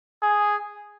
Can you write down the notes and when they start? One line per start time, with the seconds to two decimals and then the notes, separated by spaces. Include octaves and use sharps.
0.22 G#4